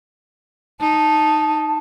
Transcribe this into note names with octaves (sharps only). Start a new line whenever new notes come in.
D#4 A5